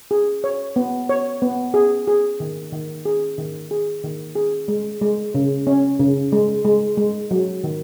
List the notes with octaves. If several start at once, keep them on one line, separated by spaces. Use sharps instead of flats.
G#4
C#5
B3
C#5
B3
G#4
G#4
D#3
D#3
G#4
D#3
G#4
D#3
G#4
G#3
G#3
C#3
C#4
C#3
G#3
G#3
G#3
F#3
D#3